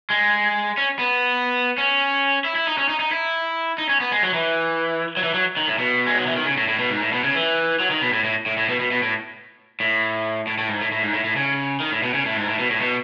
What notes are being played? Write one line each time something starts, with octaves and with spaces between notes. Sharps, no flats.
G#3
C#4
B3
C#4
E4
E4
D#4
C#4
D#4
D#4
E4
D#4
C#4
B3
G#3
F#3
E3
F#3
E3
F#3
D#3
A2
B2
G#3
F#3
E3
D#3
C#3
A2
A2
B2
G#2
A2
B2
C#3
E3
F#3
D#3
B2
A2
A2
A2
A2
B2
B2
B2
A2
A2
A2
A2
G#2
A2
A2
G#2
A2
A2
C#3
D#3
A2
B2
C#3
A2
G#2
A2
B2
A2
B2